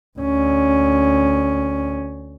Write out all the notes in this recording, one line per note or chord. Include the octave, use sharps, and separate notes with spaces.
D2 C#4